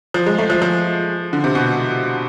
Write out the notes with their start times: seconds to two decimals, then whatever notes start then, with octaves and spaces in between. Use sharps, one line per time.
0.14 F3
0.26 G#3
0.38 A3
0.50 F3
0.62 F3
1.33 D3
1.44 C3
1.55 B2